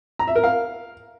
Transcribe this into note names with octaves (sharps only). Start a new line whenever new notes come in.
A#5
E5
A#4
F5